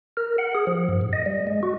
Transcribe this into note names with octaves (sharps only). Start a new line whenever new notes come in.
A#4
F#5
G#4
F3
G2
A2
D#5
G3
G#3
F#4